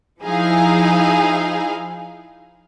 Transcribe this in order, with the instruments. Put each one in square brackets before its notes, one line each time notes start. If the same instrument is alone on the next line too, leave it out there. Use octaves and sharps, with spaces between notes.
[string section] F3 D#4 E4 G#4 F5